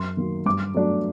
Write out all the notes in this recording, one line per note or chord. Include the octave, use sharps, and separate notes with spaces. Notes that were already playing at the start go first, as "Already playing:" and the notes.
Already playing: F#2 C6
D#3 F#3 A#3
G2 D6
F#3 A3 D4